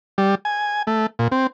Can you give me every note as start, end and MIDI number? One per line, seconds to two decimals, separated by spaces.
0.18 0.35 55
0.45 0.82 80
0.87 1.06 57
1.19 1.28 46
1.32 1.47 60